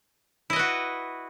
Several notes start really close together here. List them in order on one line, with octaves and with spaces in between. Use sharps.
E4 D#5 B4 F#4